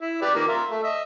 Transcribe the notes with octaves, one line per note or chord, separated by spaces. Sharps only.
E4
G4 B4 D5
D#3 F3 A#3
F4 A#4 E5
A3 E5
D#5 E5